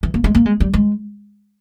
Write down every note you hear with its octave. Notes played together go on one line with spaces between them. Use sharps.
E3
A#3
G#3
A#3
G#3
G3
G#3